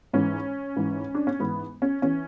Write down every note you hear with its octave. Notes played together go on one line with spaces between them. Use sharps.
G#2 E3 C#4
G#2 E3
D4
C#4
G#2 E3 B3
C#4
E3 C#4